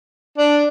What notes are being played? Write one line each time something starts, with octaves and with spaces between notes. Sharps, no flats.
D4